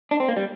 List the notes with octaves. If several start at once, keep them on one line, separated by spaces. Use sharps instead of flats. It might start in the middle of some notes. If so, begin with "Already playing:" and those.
D4
C4
A#3
G3